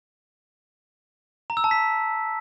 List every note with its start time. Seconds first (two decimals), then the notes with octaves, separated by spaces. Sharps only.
1.50 A#5
1.57 E6
1.64 A5
1.71 B6